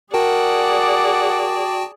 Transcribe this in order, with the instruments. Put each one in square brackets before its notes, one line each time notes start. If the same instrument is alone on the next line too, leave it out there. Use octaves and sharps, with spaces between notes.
[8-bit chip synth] F#4 G5 A5 [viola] G#4 D5 [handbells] A#4 [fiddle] F#5